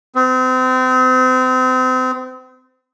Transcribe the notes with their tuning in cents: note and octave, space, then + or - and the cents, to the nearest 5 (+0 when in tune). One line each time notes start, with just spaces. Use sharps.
C4 -35